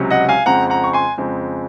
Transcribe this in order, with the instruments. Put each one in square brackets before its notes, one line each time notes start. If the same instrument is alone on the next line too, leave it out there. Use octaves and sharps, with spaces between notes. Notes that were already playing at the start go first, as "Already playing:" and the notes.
Already playing: [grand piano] C#2 C3 F#3 C#4
D#5 F#5
F5 G#5
F2 C#3 G#3 C4 F#5 A#5
F#5 A#5
C#6
G#5 C6
F2 C#3 G#3 C4